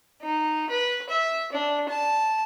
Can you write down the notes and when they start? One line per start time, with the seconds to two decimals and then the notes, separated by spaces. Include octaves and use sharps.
0.22 D#4
0.70 B4
1.10 E5
1.52 D4
1.89 A5